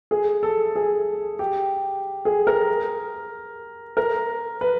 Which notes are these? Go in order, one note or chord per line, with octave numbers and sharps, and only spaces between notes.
G#4
A4
G#4
G4
G#4
A#4
A#4
B4